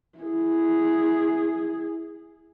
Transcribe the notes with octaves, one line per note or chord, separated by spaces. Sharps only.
E4 G#4